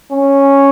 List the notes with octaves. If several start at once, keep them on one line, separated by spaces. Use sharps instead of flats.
C#4